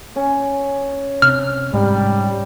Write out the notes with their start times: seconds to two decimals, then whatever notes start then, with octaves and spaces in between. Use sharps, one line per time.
0.16 C#4
1.22 C3 F6
1.74 G#2 G3